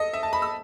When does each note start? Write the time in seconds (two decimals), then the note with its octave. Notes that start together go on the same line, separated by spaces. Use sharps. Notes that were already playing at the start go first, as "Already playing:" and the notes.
Already playing: A4 D#5
0.13 E5
0.23 A5
0.33 B5
0.42 E6